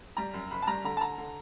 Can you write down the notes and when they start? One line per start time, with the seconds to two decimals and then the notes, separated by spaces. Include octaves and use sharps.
0.17 G3 A#5
0.33 F#2
0.51 F#1 B5
0.62 A5
0.67 G3 A#5
0.84 D3 A#5
0.97 A5
1.01 D3 A#5
1.18 D3